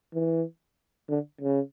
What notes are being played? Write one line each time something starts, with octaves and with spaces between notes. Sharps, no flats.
E3
D3
C#3